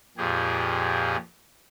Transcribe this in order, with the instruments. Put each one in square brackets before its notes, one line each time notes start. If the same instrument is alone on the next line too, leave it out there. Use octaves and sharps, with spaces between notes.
[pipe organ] F2 A#2 G4 G#4